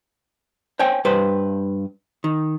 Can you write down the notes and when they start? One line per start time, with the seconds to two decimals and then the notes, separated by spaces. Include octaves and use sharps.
0.79 C5 C#5 G5 G#5
1.05 G2 B4 C5
2.24 D#3